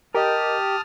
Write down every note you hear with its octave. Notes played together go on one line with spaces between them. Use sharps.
G4 A#4 D#5 A5 D#6 F6